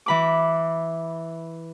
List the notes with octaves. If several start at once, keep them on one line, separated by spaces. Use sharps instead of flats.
E3 B5 D6